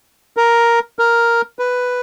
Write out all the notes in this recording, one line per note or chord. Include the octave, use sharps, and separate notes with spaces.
A#4
A#4
B4